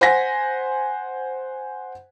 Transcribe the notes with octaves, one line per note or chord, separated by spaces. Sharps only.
C5 F#5 G#5 A#6 B6